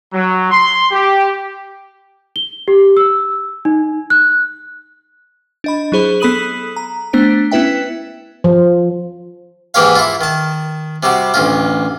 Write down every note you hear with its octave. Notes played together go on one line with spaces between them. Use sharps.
F#3
C6
G4
G7
G4
E6
D#4
F#6
D4 D#5 B5
F#3 E4 G#4 C5 B5
B3 A4 B5 D#6 D#7 F#7
A#5
A3 B3 D4 C5 D7
B3 C#4 E4 B4 E5 G5
F3
G#2 E3 A#3 G4 C#5 F5
E4 F4
D#3 A5
C3 G3 C4 F#4
A1 D2 F4